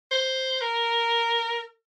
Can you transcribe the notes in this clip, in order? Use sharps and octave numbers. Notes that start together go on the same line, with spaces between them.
C5
A#4